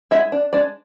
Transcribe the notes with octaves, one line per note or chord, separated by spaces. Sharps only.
G#3 E4 E5
D4
G#3 D4 D5